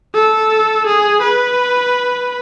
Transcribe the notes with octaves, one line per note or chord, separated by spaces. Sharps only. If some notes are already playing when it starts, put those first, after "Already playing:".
A4
G#4
B4